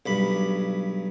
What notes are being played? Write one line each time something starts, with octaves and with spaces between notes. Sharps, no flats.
B1 G2 B5